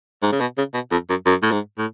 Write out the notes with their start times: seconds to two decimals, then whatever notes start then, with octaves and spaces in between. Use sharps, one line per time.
0.23 G#2
0.32 C#3
0.41 B2
0.58 C#3
0.74 B2
0.92 F2
1.10 F#2
1.26 F#2
1.42 A2
1.52 G#2
1.78 A2